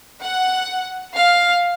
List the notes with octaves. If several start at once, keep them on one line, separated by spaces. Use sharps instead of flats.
F#5
F5